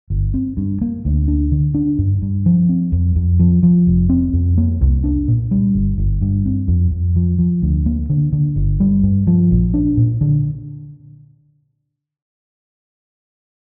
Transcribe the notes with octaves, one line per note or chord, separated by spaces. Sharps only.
G1
C4
G2
A#3
D2
D4
D3
D4
G2
G2
F3
C4
F2
F2
F3
F3
F1
C4
F2
A#3
C2
D4
A#2
G3
G1
G1
G2
C4
F2
F2
F3
F3
D2
A#3
D3
D3
G1
G3
G2
F3
A#1
D4
A#2
D3